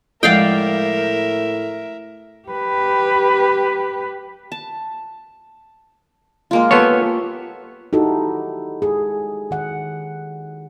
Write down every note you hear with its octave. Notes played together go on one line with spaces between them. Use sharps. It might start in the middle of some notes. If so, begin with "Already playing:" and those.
A2 F3 G#3 A#4 D5 E5 F5 G5
G4 B4
A5
G#3 A#3 F4
B3 G4 A4 C#5 G#5 C6
D#4 E4 F#4 G4 A4
G#4
D#3 F#5